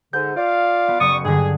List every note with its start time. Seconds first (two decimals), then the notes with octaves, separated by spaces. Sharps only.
0.13 G#2 D3 G6
0.36 F4 D5 F5
0.88 B3
1.00 F#1 D5 C#6 D#6
1.25 G2 D3 G#4